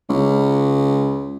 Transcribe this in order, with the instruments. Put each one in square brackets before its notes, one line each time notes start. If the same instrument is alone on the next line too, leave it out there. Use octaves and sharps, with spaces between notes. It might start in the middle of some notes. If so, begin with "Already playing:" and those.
[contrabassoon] C#2